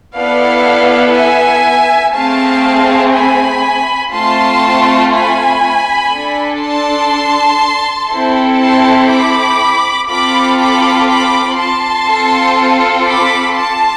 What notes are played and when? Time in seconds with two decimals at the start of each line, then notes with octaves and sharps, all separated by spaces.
0.16 B3 E4 A4 D5 F5
1.15 E5 G#5
2.15 A3 C4 G#4 F5 A5
3.14 G#5 B5
4.13 A3 C4 F4 A5 C6
5.12 G#5 B5
6.12 D4 A4
6.62 A5 C6
8.10 C4 E4 A4
8.60 A5 C6
9.10 B5 D6
10.09 C4 F4 A4 B5 D6
10.59 B5 D6
11.08 B5 D6
11.58 A5 C6
12.07 C4 F4 A4
13.07 B5 D6
13.56 A5 C6